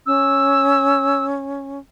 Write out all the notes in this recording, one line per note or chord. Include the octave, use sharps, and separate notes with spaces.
C#4 E6